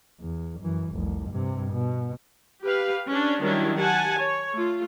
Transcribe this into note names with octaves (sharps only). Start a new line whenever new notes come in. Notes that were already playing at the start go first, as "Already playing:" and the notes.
E2
F#2 E3
F1 C2
G2 C3
B2
G4 B4 F5
C#4 D4
D#3 F#3 G3 C#4 D4 E4
G4 F#5 G#5 A5
C#5
A3 F4